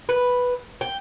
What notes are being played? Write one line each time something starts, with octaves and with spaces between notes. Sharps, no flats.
B4
G5